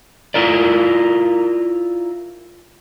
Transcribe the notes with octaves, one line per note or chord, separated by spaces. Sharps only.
E4 F4 A#4 D5